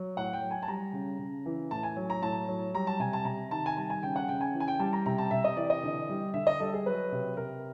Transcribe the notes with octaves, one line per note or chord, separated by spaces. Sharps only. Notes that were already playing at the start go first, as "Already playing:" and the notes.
Already playing: F#3
A2 F#5
G5
F#3
G#5
A5
G3 A#5
C#3
C#3
E3
A2 A5
G#5
F#3
A#5
A2 A5
F#3
G3 A#5
A5
C3 G#5
A5
C3 A#5
D#3 A5
G#5
G3 A5
G#5
C#3 G5
F#5
C#3 G5
G#5
E3
G#5
G5
G3 A5
A#5
C3 A#5
A5
C3 E5
D#5
E3 D5
D#5
D3
G3
D3 E5
D#5
G3 A4
G#4
F#3 B4
C3
C3 A#4